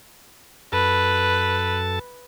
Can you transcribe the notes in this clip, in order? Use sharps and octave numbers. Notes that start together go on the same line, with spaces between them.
F#2 A4 B4 A5